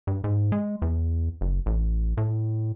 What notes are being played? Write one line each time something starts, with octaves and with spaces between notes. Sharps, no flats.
G2
G#2
G#3
E2
F#1
A1
A2